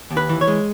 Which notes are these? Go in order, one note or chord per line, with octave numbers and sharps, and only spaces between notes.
D#2
B4
E3
C#5
G#3